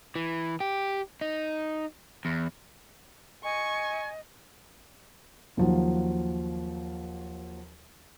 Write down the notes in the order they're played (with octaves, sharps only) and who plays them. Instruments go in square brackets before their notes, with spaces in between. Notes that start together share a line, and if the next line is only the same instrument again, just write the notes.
[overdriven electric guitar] E3
G4
D#4
E2
[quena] D#5 [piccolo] G#5 [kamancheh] C#6
[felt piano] D#2 F3 F#3